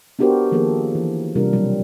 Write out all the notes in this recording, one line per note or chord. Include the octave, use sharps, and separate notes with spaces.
B3 D4 F#4 G4 A#4 C5
D#3 F3 A#3 G#4 A4
E3
C3 G3 D4 F4 A#4
B2 F#3 G3